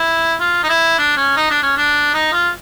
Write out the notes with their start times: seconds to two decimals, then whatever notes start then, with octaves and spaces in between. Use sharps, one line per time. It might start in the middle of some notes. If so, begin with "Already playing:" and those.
Already playing: E4
0.40 F4
0.63 D#4
0.69 E4
0.98 D4
1.17 C#4
1.37 D#4
1.50 D4
1.63 C#4
1.77 D4
2.14 D#4
2.32 F4